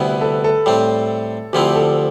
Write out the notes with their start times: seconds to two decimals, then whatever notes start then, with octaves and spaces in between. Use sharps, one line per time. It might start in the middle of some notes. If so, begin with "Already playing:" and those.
Already playing: D2 C3 G3 B3 E4 B4
0.21 A4
0.44 A4
0.66 A2 G3 C4
1.53 D2 D3 F3 C4 E4 G4
1.76 A4